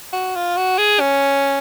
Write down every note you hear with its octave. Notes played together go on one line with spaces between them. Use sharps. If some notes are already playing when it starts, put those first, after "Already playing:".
F#4
F4
F#4
G#4
C#4